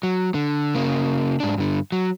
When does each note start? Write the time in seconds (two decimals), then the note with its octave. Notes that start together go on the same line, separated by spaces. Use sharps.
0.03 F#3
0.34 D3
0.75 C#3 A#3
1.40 G#2 D4
1.58 G2 D3
1.92 F#3